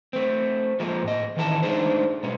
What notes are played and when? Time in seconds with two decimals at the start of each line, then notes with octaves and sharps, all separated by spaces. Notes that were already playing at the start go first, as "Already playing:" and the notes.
0.13 A3 C4
0.80 F3 G#3 A#3 C4
1.04 A2 D#5
1.37 D#3 E3 E4 A4 G#5 A5
1.63 G#3 A3 D4 D#4 G#4 C5
2.23 B2 G#3 C#4